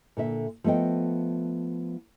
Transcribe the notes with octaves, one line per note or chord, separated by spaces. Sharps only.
A#2 D3 E5
F3 A3 B3 D#5 G5